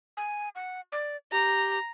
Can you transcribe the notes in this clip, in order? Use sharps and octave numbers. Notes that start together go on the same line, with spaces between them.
G#5
F#5
D5
G4 A#5